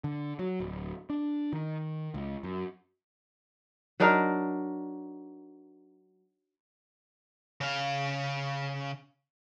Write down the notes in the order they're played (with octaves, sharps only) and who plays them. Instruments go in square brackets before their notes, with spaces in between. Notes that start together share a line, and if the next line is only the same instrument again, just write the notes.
[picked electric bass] D3
F#3
D1
D4
D#3
C#2
F#2
[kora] F#3 D4 D#4 A#4
[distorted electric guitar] C#3 F5